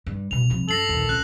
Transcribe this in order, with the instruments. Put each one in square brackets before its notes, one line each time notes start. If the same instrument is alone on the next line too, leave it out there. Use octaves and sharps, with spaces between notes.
[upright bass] G2
[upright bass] C2 B2 [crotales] F7
[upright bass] C2 F3
[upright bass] F#2 [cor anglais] A4 [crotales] A#6 C7 F#7
[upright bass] A#1 D#2
[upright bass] C#2 [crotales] F#6